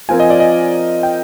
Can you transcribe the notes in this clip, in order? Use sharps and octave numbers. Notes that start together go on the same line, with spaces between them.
F3 C4 F4 A#4 G#5
D#5
D5
D#5
G5